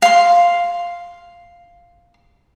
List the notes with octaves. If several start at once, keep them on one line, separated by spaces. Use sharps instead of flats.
F5 C6